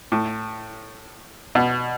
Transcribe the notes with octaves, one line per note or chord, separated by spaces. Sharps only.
A2
B2